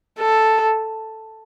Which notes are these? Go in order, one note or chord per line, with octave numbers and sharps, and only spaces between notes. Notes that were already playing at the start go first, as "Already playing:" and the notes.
A4